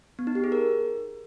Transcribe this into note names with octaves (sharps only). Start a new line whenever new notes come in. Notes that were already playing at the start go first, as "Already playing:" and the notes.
B3
D#4
G4
G#4
A#4